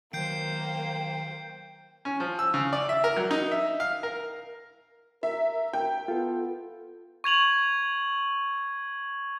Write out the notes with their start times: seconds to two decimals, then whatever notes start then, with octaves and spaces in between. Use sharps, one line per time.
0.13 D#3 F#3 A#3 C5 G5 G6 C7 D7
2.05 C#4
2.20 F3
2.39 E6
2.54 C#3
2.73 D5
2.89 E5
3.04 A#4
3.17 F#3
3.31 D#4
3.52 E5
3.80 F5
4.03 A#4
5.23 A#4 E5
5.73 G5
6.08 B3 F4 A4
7.24 C#6 G#6 F7 F#7